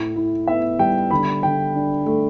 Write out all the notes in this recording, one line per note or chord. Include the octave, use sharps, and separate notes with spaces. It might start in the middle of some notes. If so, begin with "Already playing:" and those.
Already playing: A2
E4
B3 E5
G3 G5
D3 B5
D3 G5
D4
A3